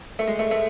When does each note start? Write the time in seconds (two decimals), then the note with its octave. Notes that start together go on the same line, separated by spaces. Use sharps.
0.19 A3
0.27 G#3
0.39 A3
0.51 A3